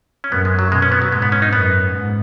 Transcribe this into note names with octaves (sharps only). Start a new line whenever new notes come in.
C#4
F#2 B3
G#3
F#3
B2 G#3
C#4
B3
F#3
G#2 G#3
B3
C#4
D#4
F#2 B3
G#2